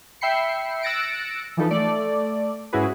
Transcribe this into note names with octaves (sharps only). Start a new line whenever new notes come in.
E5 G5 B5 C7 C#7
E6 F#6 A6 A#6 C#7 D7
E3 F3 D#4 A4 B4
A3 A4 D5
G#2 C#4 E4 F#4 G#4 B4